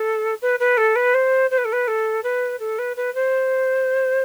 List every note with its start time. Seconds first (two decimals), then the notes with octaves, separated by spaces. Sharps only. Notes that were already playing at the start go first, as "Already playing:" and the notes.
Already playing: A4
0.42 B4
0.59 B4
0.77 A4
0.95 B4
1.14 C5
1.50 C5
1.58 B4
1.65 A4
1.72 B4
1.87 A4
2.23 B4
2.60 A4
2.78 B4
2.96 B4
3.15 C5